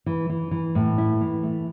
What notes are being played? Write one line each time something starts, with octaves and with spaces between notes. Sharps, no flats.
E3
E3
E3
A2
E4
E3
A3